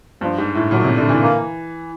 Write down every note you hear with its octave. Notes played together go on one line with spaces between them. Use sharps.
G2 F3
G#2
A2
A#2 F#3
C3
D3
E3
A#3